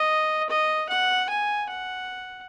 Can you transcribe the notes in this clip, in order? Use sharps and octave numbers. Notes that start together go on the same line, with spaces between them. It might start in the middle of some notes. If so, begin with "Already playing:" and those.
Already playing: D#5
D#5
F#5
G#5
F#5